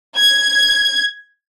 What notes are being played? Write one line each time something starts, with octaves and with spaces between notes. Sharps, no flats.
G#6